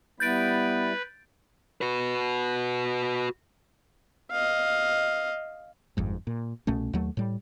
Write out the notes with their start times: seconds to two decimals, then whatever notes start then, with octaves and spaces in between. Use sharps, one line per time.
0.20 G3 B3 E4 B4 G6 A6 D7
1.81 F#4 B4
4.32 D#5 F5
5.97 G1 F2 G#2
6.27 A#2
6.67 C2 B2 A3 C#4
6.93 D#2 F#3 A3
7.17 A2 G3